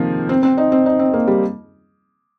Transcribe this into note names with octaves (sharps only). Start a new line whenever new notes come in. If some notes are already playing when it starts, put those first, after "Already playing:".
Already playing: C3 D#3 F3 A#3
C4
C4
D#4
C4
D#4
C4
A#3
G3